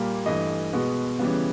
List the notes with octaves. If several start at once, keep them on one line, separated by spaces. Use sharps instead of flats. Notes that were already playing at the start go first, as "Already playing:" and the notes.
Already playing: A#2 G3 A#3
G2 E3 A3 D#5
B2 G#3 B3
C#3 E3 G3 B3